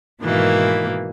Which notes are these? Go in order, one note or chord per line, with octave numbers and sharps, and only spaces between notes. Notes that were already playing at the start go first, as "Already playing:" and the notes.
G#2 B2 D#3 E3 A#3